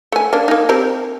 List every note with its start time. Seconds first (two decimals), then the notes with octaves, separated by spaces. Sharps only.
0.12 A3 G#5
0.33 A#3 D4
0.48 A#3 D#4
0.69 C4 G4 A#4